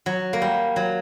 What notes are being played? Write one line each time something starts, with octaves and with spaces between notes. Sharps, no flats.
F#3
A#3
G3
F#3